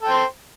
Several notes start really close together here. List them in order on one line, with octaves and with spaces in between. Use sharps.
A4 G5 C5